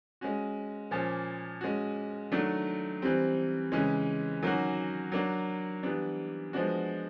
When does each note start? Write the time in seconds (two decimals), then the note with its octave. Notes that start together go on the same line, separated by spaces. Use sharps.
0.21 G#3 C#4 F#4
0.91 A#2 F3 A#3 C#4
1.61 G#3 C#4 F#4
2.31 D#3 F#3 A3 D4
3.02 E3 G3 C4
3.72 C#3 E3 G#3 C#4
4.43 D#3 F#3 A#3 C#4 F#4
5.12 F#3 A#3 D4
5.83 E3 G3 B3 D4
6.53 F3 G#3 B3 D4 F#4